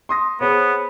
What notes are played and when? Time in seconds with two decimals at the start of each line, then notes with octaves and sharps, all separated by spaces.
0.09 C6 D#6 A#6
0.41 B3 G#4 C5 C#5